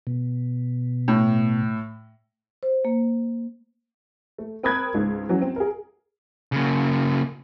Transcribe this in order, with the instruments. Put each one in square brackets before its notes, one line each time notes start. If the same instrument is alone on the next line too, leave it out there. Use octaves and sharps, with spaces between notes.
[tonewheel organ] B2
[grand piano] A2
[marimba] C5
A#3
[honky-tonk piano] A3
C4 A#4 B5 D#6 F#6 G#6
C#2 G#2
E3 F#3 C#4 F#4
C4
G#4 A#4
[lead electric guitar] C#3 A#3